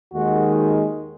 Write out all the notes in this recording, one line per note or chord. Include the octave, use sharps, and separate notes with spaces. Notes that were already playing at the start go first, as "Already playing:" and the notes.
D#2 D#3 G#3 F#4